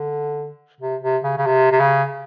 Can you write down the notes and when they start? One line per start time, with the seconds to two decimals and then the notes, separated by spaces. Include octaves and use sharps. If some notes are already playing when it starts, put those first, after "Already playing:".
Already playing: D3
0.81 C3
1.02 C3
1.24 C#3
1.37 C#3
1.46 C3
1.72 C3
1.80 C#3